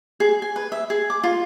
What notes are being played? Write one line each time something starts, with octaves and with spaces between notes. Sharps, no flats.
G#4
G#5
B4
E5
G#4
D6
F4